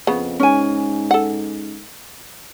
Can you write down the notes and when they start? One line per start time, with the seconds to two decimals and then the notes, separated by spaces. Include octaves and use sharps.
0.07 F2 C#3 B3
0.40 G#2 C#4 G#5
1.11 A4 F#5